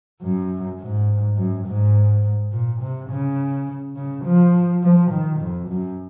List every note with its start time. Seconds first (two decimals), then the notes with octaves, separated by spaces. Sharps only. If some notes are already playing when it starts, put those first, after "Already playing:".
0.22 F#2
0.79 G#2
1.37 F#2
1.66 G#2
2.52 A#2
2.81 C3
3.10 C#3
3.96 C#3
4.25 F3
4.83 F3
5.11 D#3
5.40 F2
5.69 F#2